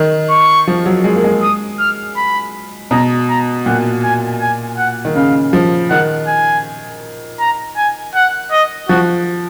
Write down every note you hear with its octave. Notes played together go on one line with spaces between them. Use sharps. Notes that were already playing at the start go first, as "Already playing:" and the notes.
Already playing: D#3
C#6
F3
F#3
G#3
A#3
G#3
D#6
F6
B5
B2 A#5
A#5
A#2 F#5
G#5
G#5
F#5
D#3
C#3 F5
F3
D#3 F#5
G#5
A#5
G#5
F#5
D#5
F3 F#4